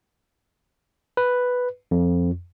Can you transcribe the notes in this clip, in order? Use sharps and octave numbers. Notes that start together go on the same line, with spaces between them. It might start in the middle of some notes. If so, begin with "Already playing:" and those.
B4
F2